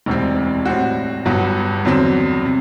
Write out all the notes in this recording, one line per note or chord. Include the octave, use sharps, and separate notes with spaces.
E1 D2 C3 G3 C4
A2 G3 C4 F#4
G1 G2 F#3 B3 F#4
E2 D3 F#3 C4
C3